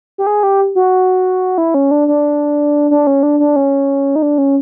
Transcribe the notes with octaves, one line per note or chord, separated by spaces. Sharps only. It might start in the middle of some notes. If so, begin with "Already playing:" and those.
G4
G#4
G4
F#4
E4
C#4
D4
D4
D4
C#4
D4
D4
C#4
D#4
D4
C#4